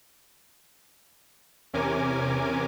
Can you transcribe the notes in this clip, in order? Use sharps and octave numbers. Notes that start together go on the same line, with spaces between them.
E2 C3 C#4 A#4 G#5 D6